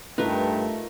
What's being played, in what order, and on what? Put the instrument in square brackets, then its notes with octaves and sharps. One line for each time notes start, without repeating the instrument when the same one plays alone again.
[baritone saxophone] G2 [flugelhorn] A3 [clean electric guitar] D#4 F4 A#4 [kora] B4